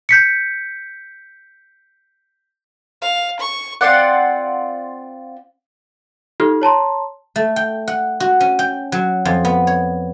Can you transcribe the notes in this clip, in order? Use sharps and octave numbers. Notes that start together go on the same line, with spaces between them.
G6 B6 C#7
F5
C#6
C4 F4 D5 F#5
D#4 F4 G4 A4 F6
C#5 A5 A#5 C6
A3
G5
F#5
F#4
C#4
G5
F#3
F2
B3
C#5